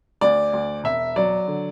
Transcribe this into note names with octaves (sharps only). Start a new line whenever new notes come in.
D2 D5
D2
E1 E5
F#3 D5
D3